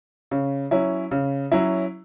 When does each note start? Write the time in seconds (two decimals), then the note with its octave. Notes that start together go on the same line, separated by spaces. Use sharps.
0.31 C#3
0.71 F#3 C#4 E4
1.11 C#3
1.52 F#3 C#4 E4